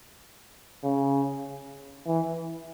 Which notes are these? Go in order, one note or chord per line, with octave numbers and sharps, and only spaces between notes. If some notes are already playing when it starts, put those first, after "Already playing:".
C#3
E3